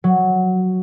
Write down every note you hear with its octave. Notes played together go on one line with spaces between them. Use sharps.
F#3